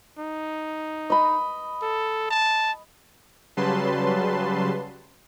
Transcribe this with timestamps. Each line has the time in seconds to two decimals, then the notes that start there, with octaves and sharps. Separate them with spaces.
0.19 D#4
1.10 D#5 B5
1.82 A4
2.31 A5
3.57 C#3 F#3 G3 B4 A5 C6